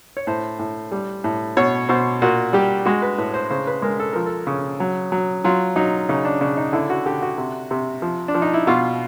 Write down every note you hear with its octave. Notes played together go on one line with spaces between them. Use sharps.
C#5
A2 C5
A2
G3
A2
B2 C#5
B2 C5
A#2 F#4
G3 G4
G#3 F#4
B4
A2 B4
C5
C#3 C5
B4
G#3 A#4
A4
F3 A#4
A4
C#3
F#3
F#3
F#3 F4
F#3 D#4
C#3 D#4
D4
C#3 D4
D#4
D3 E4
F#4
D3 G4
F#4
C3
C3
F3
D4
F3
D#4
E4
B2 F4